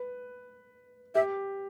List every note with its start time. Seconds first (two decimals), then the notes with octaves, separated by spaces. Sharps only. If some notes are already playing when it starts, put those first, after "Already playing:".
Already playing: B4
1.15 G4 E5